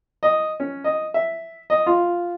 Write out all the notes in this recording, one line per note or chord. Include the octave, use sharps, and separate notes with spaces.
D#5
C#4
D#5
E5
D#5
F4